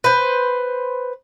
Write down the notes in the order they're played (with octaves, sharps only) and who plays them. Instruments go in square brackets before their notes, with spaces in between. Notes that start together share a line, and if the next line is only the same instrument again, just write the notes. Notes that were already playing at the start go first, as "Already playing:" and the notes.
[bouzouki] B4 C5